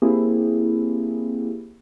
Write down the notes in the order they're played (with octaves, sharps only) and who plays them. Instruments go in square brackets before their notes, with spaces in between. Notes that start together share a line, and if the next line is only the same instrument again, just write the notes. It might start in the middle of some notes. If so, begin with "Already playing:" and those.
[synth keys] A#3 C4 E4 G4 G#4